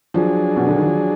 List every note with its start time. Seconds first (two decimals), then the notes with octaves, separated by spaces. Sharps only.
0.14 F3 F#3 D4 G#4
0.56 B2
0.67 D3
0.76 D#3
0.86 F3